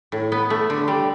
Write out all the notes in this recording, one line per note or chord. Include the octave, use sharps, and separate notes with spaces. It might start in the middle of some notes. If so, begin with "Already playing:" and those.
A2
B3
A3
D3
G3